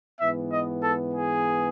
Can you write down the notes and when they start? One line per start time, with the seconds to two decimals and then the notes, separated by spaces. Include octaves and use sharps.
0.20 G#2 E3 B3 E5
0.52 D#5
0.83 A4
1.14 G#4